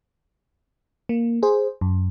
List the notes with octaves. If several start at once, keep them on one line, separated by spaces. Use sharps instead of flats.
A#3
G#4 C5
F#2